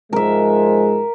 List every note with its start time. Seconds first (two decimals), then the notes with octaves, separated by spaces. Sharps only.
0.13 G#2 F3 G#3 A#4 E5